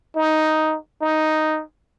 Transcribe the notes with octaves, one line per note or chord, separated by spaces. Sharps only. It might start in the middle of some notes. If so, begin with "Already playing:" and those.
D#4
D#4